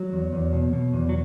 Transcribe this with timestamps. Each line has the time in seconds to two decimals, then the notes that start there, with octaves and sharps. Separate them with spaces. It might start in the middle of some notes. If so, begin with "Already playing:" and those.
Already playing: F#3
0.13 E2
0.33 E2
0.53 B2
0.73 B2
0.94 E2
1.09 F#3